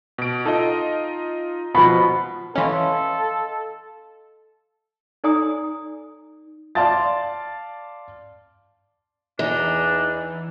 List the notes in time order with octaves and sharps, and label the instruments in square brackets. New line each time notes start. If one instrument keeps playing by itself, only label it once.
[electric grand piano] B2 D7
[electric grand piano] D#4 F4 D#5 [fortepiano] A4
[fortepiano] B2 F3 [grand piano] B5
[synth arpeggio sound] E3 C#4 [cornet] A4 [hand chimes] D#5 F5 C6
[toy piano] D#4 A4 D5 G#5 A#5 D#6
[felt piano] D5 F5 A5 C6 A6
[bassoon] E2 [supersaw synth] E3 [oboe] D4 [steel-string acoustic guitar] D#4